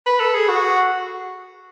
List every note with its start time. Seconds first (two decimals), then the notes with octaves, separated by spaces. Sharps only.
0.06 B4
0.20 A4
0.34 G#4
0.48 F#4